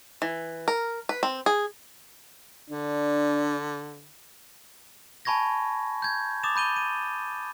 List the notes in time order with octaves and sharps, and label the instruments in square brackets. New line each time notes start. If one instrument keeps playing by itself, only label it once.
[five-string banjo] E3
A#4
B4
C4
G#4
[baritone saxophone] D3 [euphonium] D4
[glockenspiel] G#5 A5 B5 C#6 G#6 A#6
G6 G#6
D6 D#6 A6 E7 F7
B5 G6 D#7 G7
D#7